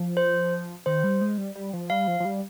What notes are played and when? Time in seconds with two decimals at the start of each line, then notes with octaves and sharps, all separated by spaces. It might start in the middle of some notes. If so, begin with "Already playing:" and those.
Already playing: F3
0.17 C5
0.86 D#3 C5
1.04 G3
1.21 G#3
1.38 G3
1.55 G3
1.73 F3
1.90 G3 F5
2.07 F3
2.20 F3
2.25 G3